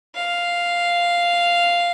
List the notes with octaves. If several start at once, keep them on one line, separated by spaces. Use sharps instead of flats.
F5